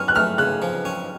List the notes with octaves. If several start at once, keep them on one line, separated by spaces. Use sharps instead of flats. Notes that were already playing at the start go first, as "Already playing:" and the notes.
Already playing: C#4 F6
F#6
A3 F6
C#3 F#6
F3
C#4